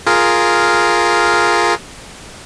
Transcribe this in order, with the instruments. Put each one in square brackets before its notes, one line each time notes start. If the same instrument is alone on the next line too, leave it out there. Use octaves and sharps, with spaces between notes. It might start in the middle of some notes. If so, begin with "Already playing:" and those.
[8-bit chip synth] F4 G#4 A#4